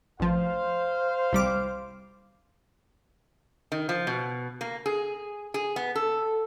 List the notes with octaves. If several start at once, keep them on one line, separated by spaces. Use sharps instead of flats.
A1 F3 C5 F5
C2 G3 D6
D#3
F3
B2
A#3
G#4
G#4
B3
A4